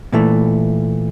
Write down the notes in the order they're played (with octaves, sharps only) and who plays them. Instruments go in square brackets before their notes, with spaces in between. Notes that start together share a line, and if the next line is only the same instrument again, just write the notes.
[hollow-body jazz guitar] A#2 E3 A3